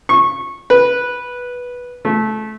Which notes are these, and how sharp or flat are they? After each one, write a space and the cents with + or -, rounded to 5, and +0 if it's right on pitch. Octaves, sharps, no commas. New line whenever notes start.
C#6 -15
B4 -10
A3 -20